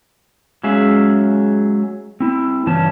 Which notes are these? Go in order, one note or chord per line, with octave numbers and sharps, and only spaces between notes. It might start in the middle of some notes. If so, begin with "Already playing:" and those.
F#3 G#3 C#4 G#4 E5 F5
C4 E4
G2 C#3 E3 C#4 A5